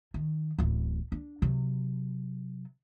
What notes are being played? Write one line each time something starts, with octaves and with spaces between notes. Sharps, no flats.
D#3
D1 A1
D4
C3 F#3